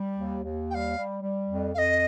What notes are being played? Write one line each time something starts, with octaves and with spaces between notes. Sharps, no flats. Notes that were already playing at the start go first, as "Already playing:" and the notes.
Already playing: G3
D#2
D#2
G3 F5 G5
G3
G3
F2
F2 D#5 F5